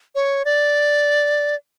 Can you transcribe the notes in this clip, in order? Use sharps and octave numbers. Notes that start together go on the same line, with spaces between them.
C#5
D5